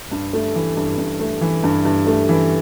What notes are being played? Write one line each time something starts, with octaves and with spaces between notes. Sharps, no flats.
G2
A3
E3
G2
G2
A3
E3
G2
G2
A3
E3